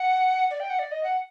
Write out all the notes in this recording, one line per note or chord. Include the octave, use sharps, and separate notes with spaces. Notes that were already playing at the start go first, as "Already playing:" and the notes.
Already playing: F#5
D5
G5
F#5
D5
D#5
F#5